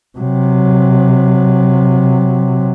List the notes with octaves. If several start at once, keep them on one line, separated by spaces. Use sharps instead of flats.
C3 F#3